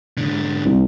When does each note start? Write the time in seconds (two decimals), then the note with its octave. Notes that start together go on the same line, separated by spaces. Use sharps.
0.17 G#2 D3
0.65 C2